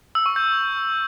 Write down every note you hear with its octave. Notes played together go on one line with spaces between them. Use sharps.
E6
C#6
G6